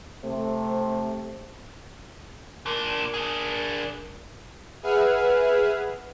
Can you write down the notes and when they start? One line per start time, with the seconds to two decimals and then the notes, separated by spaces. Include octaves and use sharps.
0.24 C3 A3 C5
2.66 A#2 D4 A#4
3.14 D4 G#4
4.83 G#4 B4 E5 F#5 F6